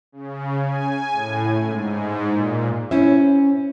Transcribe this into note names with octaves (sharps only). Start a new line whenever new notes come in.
C#3
G#5
A2
G#2
A#2
C#4 E4 C5 E5